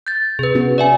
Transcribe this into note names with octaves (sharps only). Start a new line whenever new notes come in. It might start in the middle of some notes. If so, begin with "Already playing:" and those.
G6 A6
C3 G#4 B4
B3 C#4 F#4
D5 E5 G#5